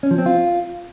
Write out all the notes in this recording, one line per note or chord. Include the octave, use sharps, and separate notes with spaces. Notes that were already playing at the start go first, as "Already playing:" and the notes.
C#4
F3
C4
F4